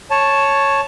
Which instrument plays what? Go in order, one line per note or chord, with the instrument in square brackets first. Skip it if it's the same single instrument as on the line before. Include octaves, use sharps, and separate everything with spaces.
[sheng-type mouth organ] C#5 A5